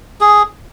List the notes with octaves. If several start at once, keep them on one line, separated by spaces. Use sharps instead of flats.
G#4